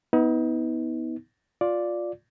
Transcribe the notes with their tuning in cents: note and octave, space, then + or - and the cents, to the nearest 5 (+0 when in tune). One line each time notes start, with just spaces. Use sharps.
B3 +0 D#4 +40
F4 +15 D5 +0